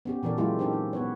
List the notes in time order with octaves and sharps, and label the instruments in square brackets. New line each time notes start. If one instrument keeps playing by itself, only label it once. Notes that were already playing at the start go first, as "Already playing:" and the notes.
[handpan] B3 C#4 G4
A#2 E3 A4 A#4 D5
F#3 G#3 A#3 E4 F4 G4
C4 C#4 D#4 G4 A4 A#4
D#4
B3 B4 C#5